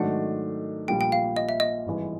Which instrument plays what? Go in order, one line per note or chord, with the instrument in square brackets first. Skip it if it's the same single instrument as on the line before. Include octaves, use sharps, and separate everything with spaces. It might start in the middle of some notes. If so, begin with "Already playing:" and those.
Already playing: [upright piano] G#2 D#3 F#3 A3 D4 [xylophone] F#5
[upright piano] A#1 A#2 G3 [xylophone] G5
[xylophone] G5
F5
D#5
E5
D#5
[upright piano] G#1 G2 E3 G#3